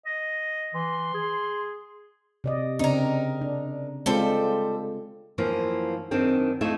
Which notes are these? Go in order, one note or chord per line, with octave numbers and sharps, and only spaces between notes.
D#5
E3 C6
G#4
C3 D5 D#5
C#3 C4 D4 D#4 A#4
D4
G3 G#3 C4 F4 A4 C5
F#2 E3 F3 A#3 C5
F#2 D#3 C4 D4
F2 A3 D#4 E4 E5